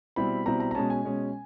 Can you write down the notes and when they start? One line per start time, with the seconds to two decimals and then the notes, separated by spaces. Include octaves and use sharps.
0.16 B2 G3 C4 E4 B5
0.46 B2 G3 C4 E4 A#5
0.60 A#5
0.71 A#5
0.75 B2 G#3 C#4 A5
0.90 G#5
1.04 B2 G#3 C#4